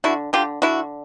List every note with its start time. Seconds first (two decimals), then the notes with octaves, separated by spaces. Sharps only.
0.04 D3 E4 F#4
0.33 D3 F4 G4
0.62 D3 E4 F#4